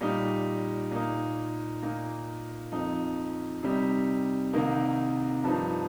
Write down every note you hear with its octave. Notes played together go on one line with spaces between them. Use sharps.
A#2 G3 D#4
A#2 A#3 D#4
A#2 A#3 D#4
F2 F3 D#4
C3 G3 D#4
C2 C3 D#3 A#3 D#4
G2 F3 D#4